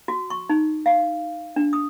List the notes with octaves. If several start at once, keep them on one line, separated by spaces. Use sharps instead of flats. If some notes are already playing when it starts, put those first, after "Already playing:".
F#4
C#6
D#4
F5
D4
D#6